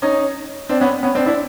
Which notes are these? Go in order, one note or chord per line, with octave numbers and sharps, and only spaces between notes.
C#4 D#4
C4 D4
B3 C#4
B3 C#4
C4 D4
D4 E4